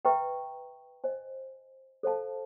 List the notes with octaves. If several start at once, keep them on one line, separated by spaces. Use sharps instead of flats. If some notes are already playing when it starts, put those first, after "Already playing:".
B4 E5 G5 A#5 C#6
C5 D#5 G#5
A4 C5 F5 A5